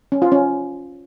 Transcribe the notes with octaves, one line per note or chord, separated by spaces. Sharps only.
C#4
F4
C#4